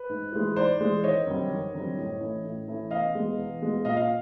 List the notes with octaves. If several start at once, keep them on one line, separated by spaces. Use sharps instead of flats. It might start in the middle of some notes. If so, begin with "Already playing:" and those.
Already playing: B4
G#2
E3 G#3
G#2 C5 D5
E3 G#3
G#1 C#5 D#5
F#2 D3 G3 C4
G#1
F#2 D3 G3 C4
A2
E3 A3 C#4 E4
A2
E3 A3 C#4 E4
E2 D#5 F5
B2 G#3
E2
B2 G#3
A#2 D#5 F5
D#5 F5